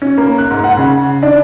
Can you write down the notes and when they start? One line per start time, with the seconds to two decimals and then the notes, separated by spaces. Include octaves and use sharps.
0.02 C#4
0.18 A#3
0.38 F#6
0.50 G#2
0.64 F#5
0.77 C#3
1.23 D4